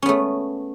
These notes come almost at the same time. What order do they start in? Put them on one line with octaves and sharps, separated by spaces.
C#4 B3 A3